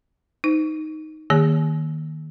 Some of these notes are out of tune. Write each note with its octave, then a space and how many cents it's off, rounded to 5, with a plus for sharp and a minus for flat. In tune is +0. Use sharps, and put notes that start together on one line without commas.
D#4 +0 C5 -30
D#3 +0 A#3 +0 G#4 -35